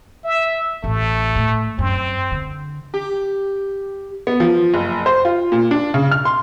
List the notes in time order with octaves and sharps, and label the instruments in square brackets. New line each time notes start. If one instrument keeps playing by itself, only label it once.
[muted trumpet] E5
[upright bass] A1 [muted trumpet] A3
[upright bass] A2
[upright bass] F#2 [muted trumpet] C4
[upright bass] D3
[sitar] G4
[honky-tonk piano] B3
F3
F#1
C5
F4
A#2
D4
C#3
F6
C6